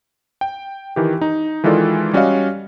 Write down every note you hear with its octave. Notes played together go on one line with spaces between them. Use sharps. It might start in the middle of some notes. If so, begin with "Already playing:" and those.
G5
D#3 E3 G4
D#4
D#3 E3 G#3 F4 A4 D5
G3 C#4 F#4 D5 D#5 F5